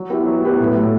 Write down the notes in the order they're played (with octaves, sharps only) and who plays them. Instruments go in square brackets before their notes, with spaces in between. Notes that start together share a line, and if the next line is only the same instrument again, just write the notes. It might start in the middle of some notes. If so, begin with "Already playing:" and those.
Already playing: [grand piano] F#3
B3 E4 G4 B4
F#3
B3 E4 G4 B4
A2
F#3 A3